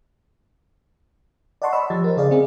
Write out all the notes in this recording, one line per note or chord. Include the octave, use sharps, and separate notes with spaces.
D5 D#5 F#5 A5 C6 C#6
C#5 D#5 B5 E6
F3 G4 A6
A#4 C5
C#3 G#4 D5 D#5 F5
C4 G#4